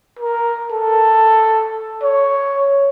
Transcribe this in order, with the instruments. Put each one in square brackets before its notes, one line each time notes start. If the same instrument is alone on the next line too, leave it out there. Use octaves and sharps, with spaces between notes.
[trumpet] A#4
A4
C#5